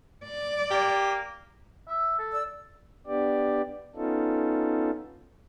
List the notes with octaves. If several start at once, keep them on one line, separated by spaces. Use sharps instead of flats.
D5
A#3 G4
E5
A4
D5 E6
B3 D4 G4 D5
B3 C#4 D#4 F4 A4